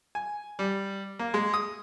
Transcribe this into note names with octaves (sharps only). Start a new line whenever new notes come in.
G#5
G3
A#3
G#3
D#6